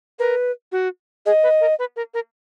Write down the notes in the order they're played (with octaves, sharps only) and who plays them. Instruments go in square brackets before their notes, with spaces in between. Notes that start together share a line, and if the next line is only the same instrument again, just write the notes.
[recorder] A#4 [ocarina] B4
[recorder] F#4
[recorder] G#4 [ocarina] D#5
[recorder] B4
A#4
B4
A#4
A#4